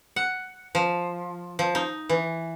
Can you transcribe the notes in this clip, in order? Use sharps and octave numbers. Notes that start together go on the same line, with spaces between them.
F#5
F3
F3
D#4
E3